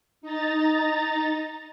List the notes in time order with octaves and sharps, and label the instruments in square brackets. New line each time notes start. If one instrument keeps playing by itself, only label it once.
[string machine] D#4 A#5 A6